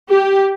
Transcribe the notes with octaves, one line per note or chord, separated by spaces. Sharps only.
G4